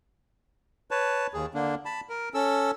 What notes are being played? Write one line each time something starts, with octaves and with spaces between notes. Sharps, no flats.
B4 C#5 A5
D#2 G#4
D3 A#3 D4
A5 B5
A#4
C#4 A4 E6